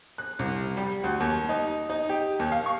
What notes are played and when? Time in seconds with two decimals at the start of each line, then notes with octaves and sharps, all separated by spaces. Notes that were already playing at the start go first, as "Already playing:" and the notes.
0.18 F#6
0.39 C2
0.77 G3
1.04 D2
1.20 D#2
1.49 D#4
1.90 D#4
2.09 G4
2.39 D#2
2.52 F5
2.66 C#6